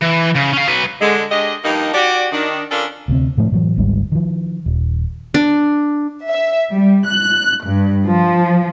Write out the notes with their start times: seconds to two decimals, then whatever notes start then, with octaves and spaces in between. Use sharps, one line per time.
0.02 E3
0.36 C#3
0.54 C#4 F5
0.68 F#3 B4
1.01 D3 G#3
1.31 G#3 D4 G4 D#5
1.64 G2 F3 A#3 D#4
1.94 F#4 G4 D5
2.32 D#3 D4
2.71 C#4 D4 F4 A4 A#4 D5
3.08 D2 C3 C4
3.38 A2 F3 A3
3.52 A2 E3 F#3
3.76 G#1 D2 G#2 G3
4.12 D#3 F3
4.66 D#1
5.34 D4
6.29 E5
6.72 G3
7.05 F#6
7.64 G2
8.07 F3